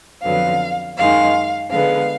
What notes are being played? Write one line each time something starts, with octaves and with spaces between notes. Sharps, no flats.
F2 D3 F#3 B3 F5
F#2 D#3 G#3 F5
D3 G#3 B3 F5